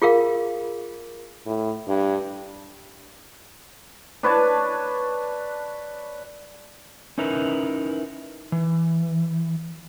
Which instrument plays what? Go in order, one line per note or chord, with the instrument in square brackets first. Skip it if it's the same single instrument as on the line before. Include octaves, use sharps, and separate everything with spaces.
[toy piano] F4 G#4 A#4 F5
[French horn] A2
G2
[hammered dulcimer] D4 B4 C#5 A5
[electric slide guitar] C#4 D#4 E4 A#4 B4
E3